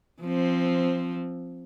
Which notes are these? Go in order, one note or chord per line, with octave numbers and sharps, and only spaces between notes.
F3 C4